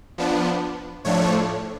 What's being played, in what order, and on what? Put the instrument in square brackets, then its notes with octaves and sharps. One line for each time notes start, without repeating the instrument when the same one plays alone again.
[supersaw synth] F3 B3 D4
A2 F3 A3 D4 C#5